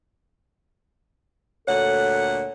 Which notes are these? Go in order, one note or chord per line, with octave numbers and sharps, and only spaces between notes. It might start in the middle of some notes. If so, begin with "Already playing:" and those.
D2 A#2 A4 C#5 F#5